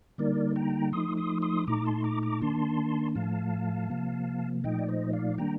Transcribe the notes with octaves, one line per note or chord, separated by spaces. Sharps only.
D3 G3 A#3 D#4 A#4 D5
G5 A#5
F3 A3 D#4 C6 D#6
C6 D#6
C6 D#6
A#2 A3 D#4 A#5 D6
A5 C6
A#5 D6
A#5 D6
D#3 A#3 D4 A5 C6
A2 F3 A3 F5 A5
C3 F3 A#3
A#2 F3 A3 D#4 D#5 G5
D5
C5 D#5
D5 F5
D#3 G3 A#3 D4 G5 A#5